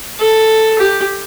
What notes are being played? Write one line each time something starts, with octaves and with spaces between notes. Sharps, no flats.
A4
G4